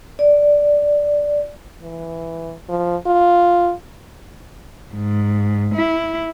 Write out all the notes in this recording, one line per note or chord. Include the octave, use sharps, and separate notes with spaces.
D5
E3
F3
F4
G#2
E4